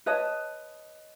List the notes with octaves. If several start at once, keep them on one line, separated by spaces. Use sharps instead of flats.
B4 C#5 D#5 A5